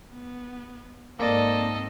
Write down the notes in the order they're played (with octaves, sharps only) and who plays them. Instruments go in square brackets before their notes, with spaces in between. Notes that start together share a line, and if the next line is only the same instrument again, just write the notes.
[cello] B3
[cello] G#2 C4 [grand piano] A#3 D5 [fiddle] A4 D#5